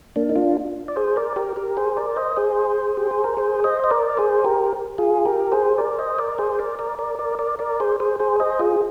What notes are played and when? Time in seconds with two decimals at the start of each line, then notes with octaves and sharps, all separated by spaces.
0.16 A#3 D4
0.29 D#4
0.36 D4 F4
0.88 D5
0.96 G#4 C5
1.16 A#4 D5
1.36 G4 A#4
1.56 G4 A#4
1.77 G#4 C5
1.97 A#4 D5
2.16 C5 D#5
2.37 G#4 C5
2.97 G4
3.11 G#4
3.24 A#4
3.37 G#4 C5
3.64 C5 D#5
3.84 D#5
3.91 A#4 D5
4.17 G#4 C5
4.44 G4 A#4
4.98 F4 G#4
5.25 G4 A#4
5.52 G#4 C5
5.78 A#4 D5
5.98 C5 D#5
6.18 A#4 D5
6.38 G#4 C5
6.59 A#4 D5
6.79 A#4 D5
6.99 A#4 D5
7.19 A#4 D5
7.39 A#4 D5
7.59 A#4 D5
7.80 G#4 C5
8.00 G#4 C5
8.19 G#4 C5
8.40 C5 D#5
8.59 F4 G#4